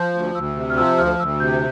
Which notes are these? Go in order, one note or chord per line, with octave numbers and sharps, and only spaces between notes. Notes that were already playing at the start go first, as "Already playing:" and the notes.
Already playing: F3 G6
D2
D2 E6
C3
F6
F3 E6
D2 F6
D2 E6
C3 G6